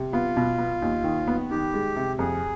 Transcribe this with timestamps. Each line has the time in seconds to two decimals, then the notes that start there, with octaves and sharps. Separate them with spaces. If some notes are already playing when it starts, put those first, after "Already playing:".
Already playing: C3
0.13 B3 F4
0.37 B2
0.58 B3
0.82 D#2
1.04 D#3
1.28 B3
1.50 D#3 G4
1.74 G#3
1.96 C3
2.19 F2 G#4